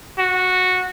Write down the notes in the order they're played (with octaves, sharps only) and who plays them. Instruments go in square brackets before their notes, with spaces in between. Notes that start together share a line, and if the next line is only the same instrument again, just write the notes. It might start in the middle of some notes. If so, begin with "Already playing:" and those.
[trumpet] F#4